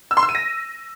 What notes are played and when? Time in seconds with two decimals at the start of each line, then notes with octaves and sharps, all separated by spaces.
0.11 E6
0.17 C6
0.23 E6
0.29 D#7
0.35 A#6